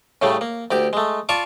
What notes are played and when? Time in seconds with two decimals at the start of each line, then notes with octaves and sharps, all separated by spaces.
0.22 A2 C#3 G3 A3
0.41 A#3
0.71 D2 G4 D6
0.93 G#3 A3
1.29 F4 D5 F5 A5 C#6 D6